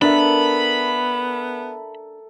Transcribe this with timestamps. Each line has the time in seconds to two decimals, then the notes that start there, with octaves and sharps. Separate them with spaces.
0.02 B3 D4 A4 A#4 E5 B5